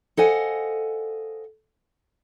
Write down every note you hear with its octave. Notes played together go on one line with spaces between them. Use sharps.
A4 C5 D#5 F5 F#5 G#5